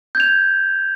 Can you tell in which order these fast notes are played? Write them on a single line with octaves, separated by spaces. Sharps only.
G6 G#6 F7